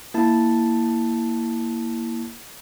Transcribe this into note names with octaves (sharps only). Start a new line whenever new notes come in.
A#3 E4 A5